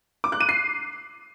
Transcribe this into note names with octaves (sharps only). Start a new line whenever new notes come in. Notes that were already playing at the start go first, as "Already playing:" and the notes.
D6
F#6
D#7
C7